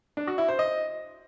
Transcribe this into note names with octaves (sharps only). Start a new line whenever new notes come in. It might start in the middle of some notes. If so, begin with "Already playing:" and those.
D4
F#4
E4
C5
D#5